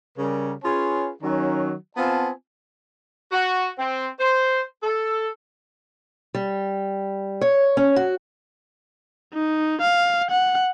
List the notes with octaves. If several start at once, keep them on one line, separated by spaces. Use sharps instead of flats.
C#3 G3 A#4
C#4 F4 G#4 B4 C#5 G#5
D#3 F#3 C#4
B3 C4 F4 G#5 A5
F#4
C4
C5
A4
G3
C#5
C#4
F#4
D#4
F5
F#5